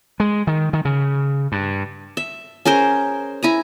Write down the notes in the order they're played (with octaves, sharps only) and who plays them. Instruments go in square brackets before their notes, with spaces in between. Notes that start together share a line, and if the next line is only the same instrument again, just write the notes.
[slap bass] G#3
D#3
D#3
C#3
G2
[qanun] E5
C#4 G#4 A#4 C5
E4 G#5 A#5